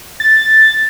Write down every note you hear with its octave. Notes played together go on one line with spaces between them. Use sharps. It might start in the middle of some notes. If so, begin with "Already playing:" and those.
A6